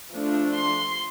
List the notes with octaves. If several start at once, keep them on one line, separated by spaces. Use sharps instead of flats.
F3 A3 D4
C6